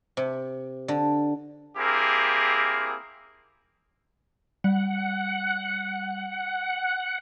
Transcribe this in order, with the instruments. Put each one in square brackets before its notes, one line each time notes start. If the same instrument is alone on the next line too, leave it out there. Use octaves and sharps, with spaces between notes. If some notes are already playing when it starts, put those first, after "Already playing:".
[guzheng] C3
D3
[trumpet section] A#3 C4 E4 G4 G#4 A#4
[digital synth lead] G3 [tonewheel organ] F#5